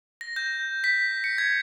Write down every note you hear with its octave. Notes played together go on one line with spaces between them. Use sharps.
A#6
G6
B6
C#7
G#6